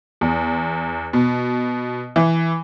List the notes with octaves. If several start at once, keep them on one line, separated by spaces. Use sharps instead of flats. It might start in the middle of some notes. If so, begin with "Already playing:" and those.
E2
B2
E3